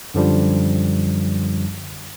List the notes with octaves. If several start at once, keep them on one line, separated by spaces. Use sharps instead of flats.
F#2 D3 F3 G3